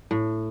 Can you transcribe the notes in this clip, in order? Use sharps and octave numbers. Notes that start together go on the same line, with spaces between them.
A2